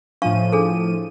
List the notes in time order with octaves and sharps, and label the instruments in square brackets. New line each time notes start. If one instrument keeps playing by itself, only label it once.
[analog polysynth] A2 F3 D#7 [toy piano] D4 F5 C#6
[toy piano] D4 G#4 A4